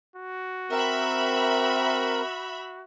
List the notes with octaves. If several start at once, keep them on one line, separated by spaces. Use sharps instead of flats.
F#4
C4 A#4 E5 B5